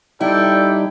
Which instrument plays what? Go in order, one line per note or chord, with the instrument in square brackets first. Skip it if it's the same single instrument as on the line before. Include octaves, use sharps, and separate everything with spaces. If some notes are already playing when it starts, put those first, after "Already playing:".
[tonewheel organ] G3 D#4 [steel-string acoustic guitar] E4 [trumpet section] G4 A4 G5 [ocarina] D5